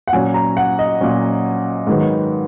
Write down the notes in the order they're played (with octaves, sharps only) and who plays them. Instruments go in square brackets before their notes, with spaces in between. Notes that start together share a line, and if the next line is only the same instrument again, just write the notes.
[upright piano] F#5
A#2 F#3 C#4 G#5
A#5
F#5
D#5
A#2 F#3 C#4
G#2 D#3 F#3 B3